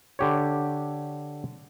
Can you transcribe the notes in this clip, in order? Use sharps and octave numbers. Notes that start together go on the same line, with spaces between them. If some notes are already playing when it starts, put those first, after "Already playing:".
D3 G4 C#5